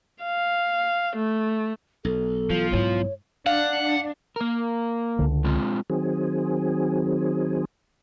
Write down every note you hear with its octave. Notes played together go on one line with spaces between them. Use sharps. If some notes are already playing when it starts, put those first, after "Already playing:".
F5
A3
B1 A4
E3 F3
G#2 E4 C#5
D4 F5 F#5
A#3 A#4
C#2 D3
G#3 C4 F4
D#3 F#3 C4 G#4